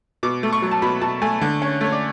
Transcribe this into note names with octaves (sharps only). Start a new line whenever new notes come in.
B2 D6
A3
C#6
F#3
A5
B2 B5
B2 A5
A3 G#5
D3
C#4
A3 C#5
D5